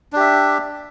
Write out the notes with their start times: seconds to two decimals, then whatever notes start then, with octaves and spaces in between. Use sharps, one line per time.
0.13 D4
0.16 G4
0.20 E5